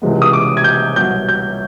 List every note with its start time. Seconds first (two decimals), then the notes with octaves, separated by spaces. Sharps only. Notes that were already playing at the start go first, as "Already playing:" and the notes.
0.02 C#2 C3 E3 G#3 B3
0.22 D#6
0.33 D6
0.57 G#6
0.64 G6
0.96 C2 B2 F#3 G6
1.29 G6